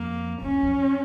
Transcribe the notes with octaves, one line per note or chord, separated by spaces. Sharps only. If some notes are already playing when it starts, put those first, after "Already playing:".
Already playing: F2 A#3
E2 C#4
F2